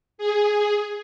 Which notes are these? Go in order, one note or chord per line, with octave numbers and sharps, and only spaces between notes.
G#4